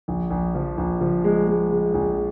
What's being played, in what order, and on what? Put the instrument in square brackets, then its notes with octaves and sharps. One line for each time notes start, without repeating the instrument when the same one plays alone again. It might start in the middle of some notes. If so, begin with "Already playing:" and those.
[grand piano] A#1
A#1
F3
A#1
F3
G#3
G#3
G#3
A#1